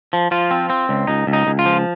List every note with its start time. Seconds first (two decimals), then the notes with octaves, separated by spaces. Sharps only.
0.13 F3
0.31 F3 F4
0.51 C4
0.70 C4
0.89 C#2
1.07 C#2 D#4
1.27 C#2
1.33 D#4
1.47 C#2
1.59 F4
1.66 F3